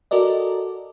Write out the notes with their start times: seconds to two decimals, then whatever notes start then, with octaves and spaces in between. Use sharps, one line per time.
0.11 F#4 A4 A#4 D5 D#5